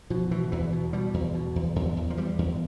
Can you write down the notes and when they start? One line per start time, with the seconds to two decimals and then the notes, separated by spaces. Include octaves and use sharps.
0.10 B2 F3
0.31 B2 E3
0.52 E2 E3
0.73 B2
0.93 B2 G3
1.14 E2
1.35 B2
1.56 E2
1.76 E2
1.97 E2
2.10 F3
2.17 E2 G3
2.38 E2